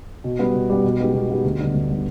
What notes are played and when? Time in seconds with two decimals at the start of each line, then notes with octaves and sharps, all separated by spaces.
0.24 B2
0.39 G3 B3
0.54 B2
0.70 G3 B3
0.84 B2
0.99 G#3 B3 D#4 G4
1.14 B2
1.30 G#3 B3 D#4 G4
1.44 D2
1.60 D3 G3 B3 D4
1.74 D2
1.89 D3 G3 B3 D4